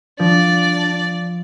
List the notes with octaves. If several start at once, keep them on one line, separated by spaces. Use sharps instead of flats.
F3 D4 D5